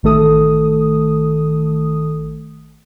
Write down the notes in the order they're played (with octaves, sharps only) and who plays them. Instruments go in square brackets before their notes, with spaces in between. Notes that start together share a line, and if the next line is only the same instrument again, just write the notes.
[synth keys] A1 D#3 A3 A4 D#6